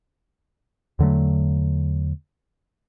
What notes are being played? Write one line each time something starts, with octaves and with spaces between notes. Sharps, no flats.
E2 D3 F#3 A3